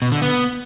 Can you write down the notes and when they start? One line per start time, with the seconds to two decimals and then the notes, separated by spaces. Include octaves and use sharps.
0.02 B2
0.12 D3
0.22 B3